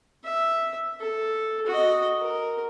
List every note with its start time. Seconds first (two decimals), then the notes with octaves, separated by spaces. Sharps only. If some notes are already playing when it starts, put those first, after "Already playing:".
0.24 E5
1.00 A4
1.67 F#4 D#5
2.21 A#4